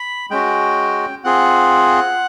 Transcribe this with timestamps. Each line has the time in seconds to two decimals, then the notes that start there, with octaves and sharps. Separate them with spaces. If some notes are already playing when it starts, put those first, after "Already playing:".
Already playing: B5
0.31 G#3 C#4 F#4 G5
1.24 C4 F4 G#4 F#5